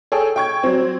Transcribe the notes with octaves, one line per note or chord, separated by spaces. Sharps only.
G#4 A4 C#5 G5 E6
G5 C#6 G#6
F#3 C4